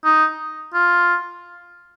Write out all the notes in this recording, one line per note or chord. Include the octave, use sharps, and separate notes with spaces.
D#4
F4